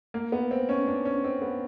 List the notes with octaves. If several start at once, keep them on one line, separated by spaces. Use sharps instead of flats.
A#3
B3
C4
C#4
D4
C#4
C4
B3